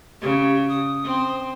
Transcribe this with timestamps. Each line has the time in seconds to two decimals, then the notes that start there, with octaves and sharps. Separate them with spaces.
0.22 C#3 G4
0.69 D#6
1.04 C4 C5